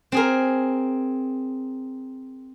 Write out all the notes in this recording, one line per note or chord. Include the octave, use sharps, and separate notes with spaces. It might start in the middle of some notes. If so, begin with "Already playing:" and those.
C4 G#4 A#4